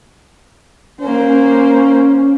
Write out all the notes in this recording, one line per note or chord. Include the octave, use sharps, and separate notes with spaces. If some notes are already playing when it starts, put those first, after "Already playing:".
A#3 C#4 C5